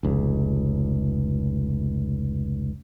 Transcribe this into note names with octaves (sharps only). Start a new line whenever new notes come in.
F1 C#2